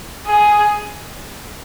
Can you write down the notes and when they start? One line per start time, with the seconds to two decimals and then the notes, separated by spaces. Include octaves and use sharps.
0.26 G#4